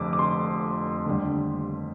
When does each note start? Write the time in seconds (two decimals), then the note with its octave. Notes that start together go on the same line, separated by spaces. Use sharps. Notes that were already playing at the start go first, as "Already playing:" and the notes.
Already playing: F1 F2 D3 D6
0.13 D6
0.19 C6
1.07 D#2 D3 G3